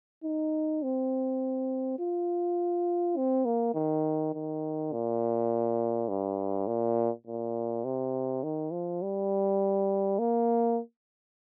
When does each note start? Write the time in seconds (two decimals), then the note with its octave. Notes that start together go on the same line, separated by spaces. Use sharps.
0.24 D#4
0.83 C4
1.99 F4
3.17 C4
3.45 A#3
3.75 D#3
4.33 D#3
4.93 A#2
6.09 G2
6.67 A#2
7.27 A#2
7.84 C3
8.43 D#3
8.72 F3
9.02 G3
10.19 A#3